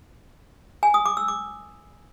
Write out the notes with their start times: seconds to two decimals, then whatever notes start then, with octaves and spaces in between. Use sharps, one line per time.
0.83 G#5
0.94 D#6
1.06 D6
1.17 E6
1.28 D6